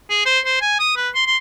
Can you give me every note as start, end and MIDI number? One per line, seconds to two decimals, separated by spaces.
0.09 0.24 68
0.25 0.39 72
0.45 0.57 72
0.61 0.76 80
0.79 0.96 87
0.96 1.09 71
1.14 1.25 84
1.26 1.37 84